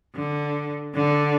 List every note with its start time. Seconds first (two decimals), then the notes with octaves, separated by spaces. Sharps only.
0.15 D3
0.95 D3